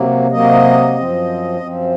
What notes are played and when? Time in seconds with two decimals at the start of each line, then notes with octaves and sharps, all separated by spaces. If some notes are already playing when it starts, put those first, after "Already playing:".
Already playing: C3 F#3 A#3
0.31 C3 F#3 A#3 D#5
0.96 F#2 F3 C4
1.60 F#2 F3 C4